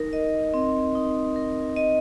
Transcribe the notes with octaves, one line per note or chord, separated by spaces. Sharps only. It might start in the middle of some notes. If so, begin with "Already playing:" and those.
Already playing: D#4 A#4
D#5
C4
D#4
A#4
D#5